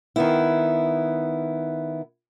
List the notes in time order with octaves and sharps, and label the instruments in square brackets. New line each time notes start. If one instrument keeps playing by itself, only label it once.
[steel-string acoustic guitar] D#3 B3 E4